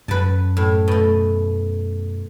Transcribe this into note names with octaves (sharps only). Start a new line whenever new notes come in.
F#2 B4 A5
A2
B2 A3